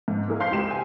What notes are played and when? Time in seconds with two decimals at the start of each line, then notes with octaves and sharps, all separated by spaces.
0.08 G#2
0.28 A#3 E4 G#4 A#4
0.40 C5 F5 C6 G6 B6 C7
0.52 C#2 C4 G4 E7
0.70 G5 G#5